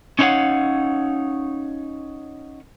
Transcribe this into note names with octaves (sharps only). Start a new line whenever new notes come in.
C#4 D#4 E4 C#5 F5 F#5